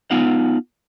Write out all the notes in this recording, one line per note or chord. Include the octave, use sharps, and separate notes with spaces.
B3 D#4 F4 F5 F#5